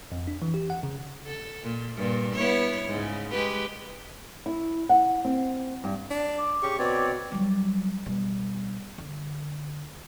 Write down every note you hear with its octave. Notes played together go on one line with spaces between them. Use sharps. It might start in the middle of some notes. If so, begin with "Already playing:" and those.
F2
D4
E3
G4
F#5
C#3
A4
A#2
G2 A#2
B3 E4 C#5
G#2 C#3
G#3 G4 B4
E4
F#5
C4
G2
D4
D6
C#3 G4 C#6
B2 C4 C#5 D5
D6
F#3 G3
B2 G3
D3